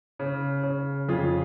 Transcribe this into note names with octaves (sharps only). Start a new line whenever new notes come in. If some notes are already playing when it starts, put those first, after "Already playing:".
C#3
C#3
F2 F4 G#4